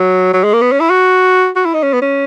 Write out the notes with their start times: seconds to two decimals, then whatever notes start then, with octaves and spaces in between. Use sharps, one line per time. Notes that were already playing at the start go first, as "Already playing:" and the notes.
Already playing: F#3
0.33 F#3
0.44 G#3
0.53 A#3
0.61 B3
0.72 C#4
0.80 E4
0.90 F#4
1.56 F#4
1.65 E4
1.74 D#4
1.83 C#4
1.93 B3
2.02 C#4